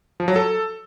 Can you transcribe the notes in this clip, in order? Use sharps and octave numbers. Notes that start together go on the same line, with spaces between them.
F3
F#3
A4